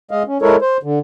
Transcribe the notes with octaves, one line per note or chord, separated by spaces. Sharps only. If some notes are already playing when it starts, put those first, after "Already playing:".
G#3 D#5 F5
C#4
G#3 E4 A4 A#4 C#5
C5
D3